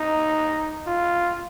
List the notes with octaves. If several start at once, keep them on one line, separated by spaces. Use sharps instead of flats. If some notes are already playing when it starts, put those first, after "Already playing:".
Already playing: D#4
F4